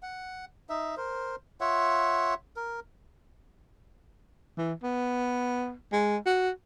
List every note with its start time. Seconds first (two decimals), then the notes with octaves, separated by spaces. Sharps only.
0.03 F#5
0.69 D#4 E5
0.97 A#4 C5
1.61 F4 C#5 E5 F#5
2.56 A#4
4.57 E3
4.83 B3
5.92 G#3
6.26 F#4